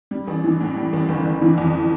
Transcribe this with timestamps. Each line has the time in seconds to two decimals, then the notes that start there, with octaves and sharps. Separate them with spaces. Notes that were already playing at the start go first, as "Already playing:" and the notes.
0.11 G3
0.27 A1
0.44 E3
0.61 A2
0.76 G3
0.93 A1
1.09 G1
1.25 G1
1.42 E3
1.58 F2